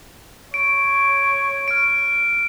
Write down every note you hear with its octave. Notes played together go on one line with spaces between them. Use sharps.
C#5 D7
F6 D7